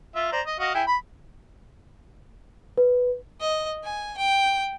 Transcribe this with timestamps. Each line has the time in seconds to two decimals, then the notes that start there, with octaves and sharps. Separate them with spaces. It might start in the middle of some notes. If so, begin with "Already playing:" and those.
0.15 F4 E5
0.32 C5 D5 A#5
0.46 D#5
0.59 F#4 D#5 F5
0.75 E4 G#4 G5
0.87 B5
2.77 B4
3.40 D#5
3.84 G#5
4.18 G5